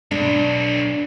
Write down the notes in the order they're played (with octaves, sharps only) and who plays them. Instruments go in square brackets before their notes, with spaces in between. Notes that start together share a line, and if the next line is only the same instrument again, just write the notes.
[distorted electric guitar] B1 [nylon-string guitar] D4